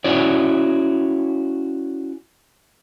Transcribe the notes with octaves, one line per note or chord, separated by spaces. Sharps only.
C#4 E4 F#4 C#5 D5